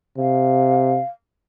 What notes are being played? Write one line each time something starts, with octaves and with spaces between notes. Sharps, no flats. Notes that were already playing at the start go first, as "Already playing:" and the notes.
C3 F5